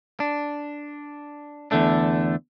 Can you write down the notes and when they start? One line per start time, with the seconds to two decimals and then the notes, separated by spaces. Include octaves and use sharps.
0.20 D4
1.71 E2 D3 A3 D4